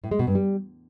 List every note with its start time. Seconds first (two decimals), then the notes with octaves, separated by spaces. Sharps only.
0.04 A2
0.11 G#3
0.19 B2
0.27 G2
0.35 G3